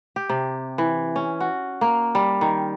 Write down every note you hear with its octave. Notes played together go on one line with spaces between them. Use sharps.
G4
C3
E3
C#4
F#4
A#3
G3
D#3